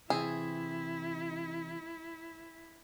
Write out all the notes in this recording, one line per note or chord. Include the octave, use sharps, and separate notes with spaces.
C3 E3 E4 G#4